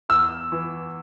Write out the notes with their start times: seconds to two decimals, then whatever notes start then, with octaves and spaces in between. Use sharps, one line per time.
0.09 E2 E6
0.52 E3